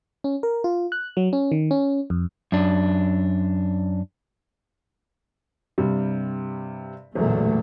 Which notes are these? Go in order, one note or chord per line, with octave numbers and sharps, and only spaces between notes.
C#4
A#4
F4
F#6
F#3
C#4
D#3
C#4
F2
F#2 D4
G2 C3 G3
E1 F#2 A#2 D3 A3